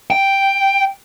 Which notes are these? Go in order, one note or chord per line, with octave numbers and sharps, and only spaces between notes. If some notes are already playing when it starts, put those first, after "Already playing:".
G5